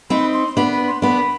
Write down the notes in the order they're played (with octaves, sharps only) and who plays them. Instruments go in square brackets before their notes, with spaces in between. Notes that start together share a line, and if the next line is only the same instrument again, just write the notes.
[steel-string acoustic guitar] C4 D#4 [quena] B5
[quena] C6
[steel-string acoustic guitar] B3 D4 [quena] B5
[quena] B5
C6
[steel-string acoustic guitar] B3 D4 [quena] B5